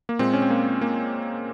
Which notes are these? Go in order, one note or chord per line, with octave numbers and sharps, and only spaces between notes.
A#3
A#2 G#3 C4
C#4
C4
A#3
A#3